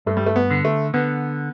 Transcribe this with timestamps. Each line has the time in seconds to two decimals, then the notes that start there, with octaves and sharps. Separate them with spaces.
0.06 G2 A3
0.17 G3
0.26 A3
0.36 B3
0.51 D3
0.65 A3
0.94 D3 B3